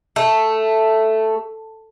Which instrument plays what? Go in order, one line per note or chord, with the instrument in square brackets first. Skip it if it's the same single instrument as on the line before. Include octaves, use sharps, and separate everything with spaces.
[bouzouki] A3